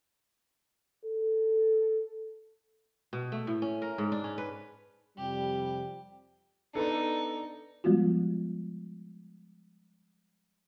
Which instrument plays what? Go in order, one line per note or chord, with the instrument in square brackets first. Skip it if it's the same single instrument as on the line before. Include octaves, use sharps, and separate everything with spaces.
[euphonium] A4
[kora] B2
A3
A2
C#4
A#4
G#2
D4
C#4
B4
[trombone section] F2 C3 G3 [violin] G4
[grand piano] B3 D4 [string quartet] D#4 [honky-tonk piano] A4 D5
[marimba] F3 G3 G#3 B3 F4 F#4